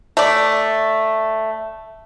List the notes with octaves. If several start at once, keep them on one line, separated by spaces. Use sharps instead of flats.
A3 D5